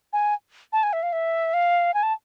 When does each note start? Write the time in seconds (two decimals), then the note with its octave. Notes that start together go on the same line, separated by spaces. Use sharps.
0.13 G#5
0.73 A5
0.83 G#5
0.93 E5
1.03 F5
1.13 E5
1.54 F5
1.94 G#5
2.03 A5